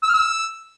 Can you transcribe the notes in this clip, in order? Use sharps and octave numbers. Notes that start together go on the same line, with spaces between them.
E6
F6
E6